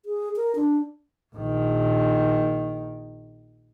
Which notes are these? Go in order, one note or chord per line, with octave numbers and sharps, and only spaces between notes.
G#4
A#4
D4
A#1 D#3